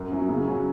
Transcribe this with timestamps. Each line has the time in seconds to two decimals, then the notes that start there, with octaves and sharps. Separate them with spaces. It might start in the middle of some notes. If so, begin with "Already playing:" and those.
Already playing: F#2
0.12 F#3 C#4 E4
0.29 C#3
0.48 F#3 C#4